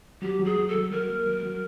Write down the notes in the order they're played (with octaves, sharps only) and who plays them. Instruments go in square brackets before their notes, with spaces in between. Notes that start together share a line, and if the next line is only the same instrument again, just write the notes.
[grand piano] F#3 [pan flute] G4
[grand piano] F#3
[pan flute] G#4
[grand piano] F#3
[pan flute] A4
[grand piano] F#3
[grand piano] F#3 [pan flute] A#4
[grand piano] A#3
F#3
F#3